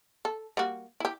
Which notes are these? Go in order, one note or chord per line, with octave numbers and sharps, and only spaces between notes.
A4
G3 A#3 F#4
E4 G4